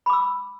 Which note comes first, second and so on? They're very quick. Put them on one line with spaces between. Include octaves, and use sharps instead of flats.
B5 D6 E6